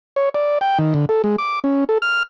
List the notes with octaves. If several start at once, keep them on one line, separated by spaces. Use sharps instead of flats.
C#5
D5
G5
D#3
D3
A4
G#3
D6
C#4
A4
F6